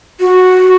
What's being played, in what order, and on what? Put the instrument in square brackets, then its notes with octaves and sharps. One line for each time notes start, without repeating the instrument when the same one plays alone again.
[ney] F#4